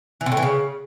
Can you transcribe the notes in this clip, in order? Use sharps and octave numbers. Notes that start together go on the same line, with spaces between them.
E3
C3
A2
E3
C#3